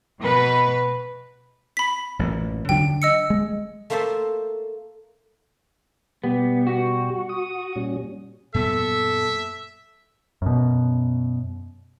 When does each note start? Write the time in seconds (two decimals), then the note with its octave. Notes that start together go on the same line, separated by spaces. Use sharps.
0.21 B2 B4
1.77 B5 B6
2.19 A1 F#2 A#2
2.69 D3 F#3 D4 G5
3.02 D#5 E6 C#7
3.30 G#3
3.90 A3 A#3 F4 C5 E5 A5
6.24 B2 G3 B3 G4
6.67 F#4
7.29 D#6
7.76 A#2 G3 C#4
8.54 F#2 A#2 B3 A4 E5
10.42 F#2 B2